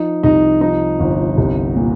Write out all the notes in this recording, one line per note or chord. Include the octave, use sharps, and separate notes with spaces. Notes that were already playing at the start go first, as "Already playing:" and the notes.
Already playing: F3 D#4
C2 D#4
F3 D#4
G1
C2
A#2